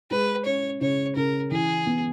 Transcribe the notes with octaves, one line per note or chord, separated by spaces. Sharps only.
G#3 B4
C#4 C#5
C#3 C#5
C#3 A#4
E3 G#4
B3